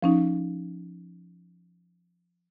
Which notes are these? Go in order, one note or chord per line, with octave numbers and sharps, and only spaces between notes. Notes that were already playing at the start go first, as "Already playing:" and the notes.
F3 C#4 D#4